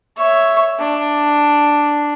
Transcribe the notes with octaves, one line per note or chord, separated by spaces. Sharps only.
C#5 E5
D4